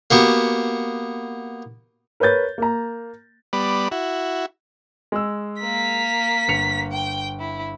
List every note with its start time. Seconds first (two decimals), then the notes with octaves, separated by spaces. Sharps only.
0.11 A#3 B3 F#4 G4
2.20 A#4 B4 C#5 G6 A6
2.58 A#3 A#5
3.53 G3 B3 D5 B5
3.91 E4 F#4
5.12 G#3 E6
5.61 A#3 B6
6.48 G1 C#7 F7
6.92 G5
7.40 E4